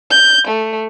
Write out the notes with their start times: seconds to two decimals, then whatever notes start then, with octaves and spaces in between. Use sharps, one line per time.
0.10 G6
0.47 A3